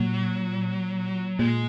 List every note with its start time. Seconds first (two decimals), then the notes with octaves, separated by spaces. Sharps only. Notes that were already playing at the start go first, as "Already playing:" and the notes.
Already playing: A#2 F#3
1.39 A#2 G#3